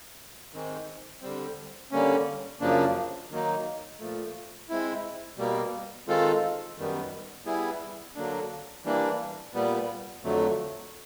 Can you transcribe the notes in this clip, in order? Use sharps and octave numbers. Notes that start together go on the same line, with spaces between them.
G#2 D#3 G#3 C4
D3 G3 C4
D3 G3 A#3 C#4
F#2 C#3 F3 A#3 D4
D#3 F#3 A#3 D#4
A#2 F3 A3
G#3 C4 E4
B2 G3 A#3
D#3 G#3 C4 F4 A4
F#2 D#3 G3 B3
G3 B3 E4 G#4
D3 F#3 A#3 D4
E3 G3 A#3 D4
A#2 G3 B3
F2 D3 F#3 A3